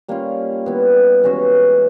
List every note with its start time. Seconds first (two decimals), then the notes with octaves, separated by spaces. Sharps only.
0.08 G3 A#3 C#4 F4
0.66 G3 B3 E4
1.24 E3 G#3 C#4 F#4